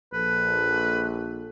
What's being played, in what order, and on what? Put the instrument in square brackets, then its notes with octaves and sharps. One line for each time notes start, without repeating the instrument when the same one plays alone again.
[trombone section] A#1 A4 [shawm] B4